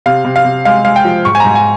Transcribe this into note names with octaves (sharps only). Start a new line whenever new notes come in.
C3 F5
C3
F5
C3
G#3 F5
G#3 F5
G5
F3
G#2 C#6
G#5
G#2 A#5
G#5